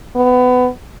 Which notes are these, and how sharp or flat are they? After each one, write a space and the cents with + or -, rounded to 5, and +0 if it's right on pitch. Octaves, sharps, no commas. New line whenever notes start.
B3 +20